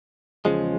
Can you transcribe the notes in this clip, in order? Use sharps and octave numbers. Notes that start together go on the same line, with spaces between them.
E2 C#3 F3 G#3